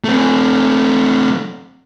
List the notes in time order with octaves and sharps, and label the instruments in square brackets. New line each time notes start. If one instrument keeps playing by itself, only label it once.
[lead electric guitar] A3 C4